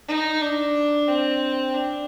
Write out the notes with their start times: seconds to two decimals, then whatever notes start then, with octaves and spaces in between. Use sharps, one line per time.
0.08 D#4
0.42 D4
1.08 C4
1.75 D4